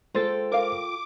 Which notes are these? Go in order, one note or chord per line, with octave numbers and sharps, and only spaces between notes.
G#3 F4 A4 C5 G5 A6
A#4 F5 D6